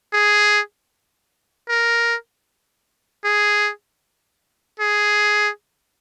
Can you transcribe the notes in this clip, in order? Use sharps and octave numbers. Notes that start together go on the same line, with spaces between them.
G#4
A#4
G#4
G#4